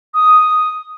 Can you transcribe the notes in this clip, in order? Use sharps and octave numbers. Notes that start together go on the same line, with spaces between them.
D#6